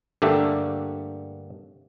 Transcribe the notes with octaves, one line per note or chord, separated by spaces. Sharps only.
G2 D3 A3 A#3 G4 E5